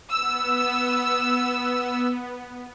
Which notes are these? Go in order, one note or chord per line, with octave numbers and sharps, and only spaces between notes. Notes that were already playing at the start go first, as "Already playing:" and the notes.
B3 E6